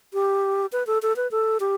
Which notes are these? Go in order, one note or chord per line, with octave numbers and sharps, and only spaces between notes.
G4
B4
A4
A4
B4
A4
G4